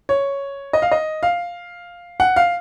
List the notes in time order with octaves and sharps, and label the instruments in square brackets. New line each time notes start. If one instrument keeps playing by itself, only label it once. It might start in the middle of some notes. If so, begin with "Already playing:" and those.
[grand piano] C#5
D#5
F5
D#5
F5
F#5
F5